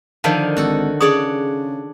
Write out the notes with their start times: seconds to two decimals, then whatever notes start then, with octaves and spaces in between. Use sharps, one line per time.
0.24 D3 D#3 F3 F5 A5
0.57 G#1 F#4 A4
1.01 C#3 D4 G#4 C#5 D5 D#6